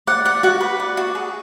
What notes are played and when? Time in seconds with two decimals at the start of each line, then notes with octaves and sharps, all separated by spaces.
0.07 D5 F#5
0.25 D5 F#5
0.43 F#4 F#5
0.61 B4
0.80 D5
0.97 F#4
1.15 G#4